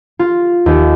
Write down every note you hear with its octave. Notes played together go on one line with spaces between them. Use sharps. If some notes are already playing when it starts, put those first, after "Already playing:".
F4
D#2